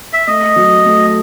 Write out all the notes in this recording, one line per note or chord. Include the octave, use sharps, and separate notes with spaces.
E5
A3 D#5
F#3
A3